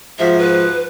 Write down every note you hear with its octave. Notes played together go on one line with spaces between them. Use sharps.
G#2 F3 F#4 E5
B4